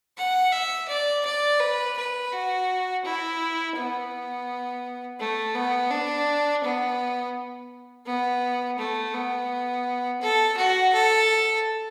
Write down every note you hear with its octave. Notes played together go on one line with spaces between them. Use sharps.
F#5
E5
D5
D5
B4
B4
F#4
E4
B3
A3
B3
D4
B3
B3
A3
B3
A4
F#4
A4